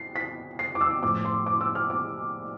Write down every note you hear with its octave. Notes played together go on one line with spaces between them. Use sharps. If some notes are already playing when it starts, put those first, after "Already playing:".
Already playing: C7
B6
C7
D6
E6
A2 F3 A3 D6
C6
D6
E6
F6
D6